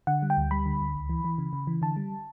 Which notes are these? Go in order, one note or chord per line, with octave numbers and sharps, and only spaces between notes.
D3 F#5
G3
G5
D2
G3 B5
D3
D2
C#2
E3
E3
C#3
C#3
E3
D3 A5
G3